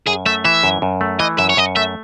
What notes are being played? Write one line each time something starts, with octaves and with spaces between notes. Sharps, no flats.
F#2 G#4
A3 E5
E3 E5
F#2
F#2
A3
E3 D#5
F#2 E5
C#5
F#2 D#5
A3 E5